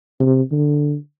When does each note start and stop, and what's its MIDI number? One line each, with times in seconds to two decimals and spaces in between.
0.20 0.42 48
0.52 0.95 50